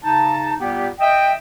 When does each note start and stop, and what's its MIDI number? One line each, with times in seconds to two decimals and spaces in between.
0.03 0.54 49
0.03 0.54 63
0.03 0.54 81
0.60 0.88 46
0.60 0.88 55
0.60 0.88 59
0.60 0.88 67
1.00 1.33 75
1.00 1.33 76
1.00 1.33 79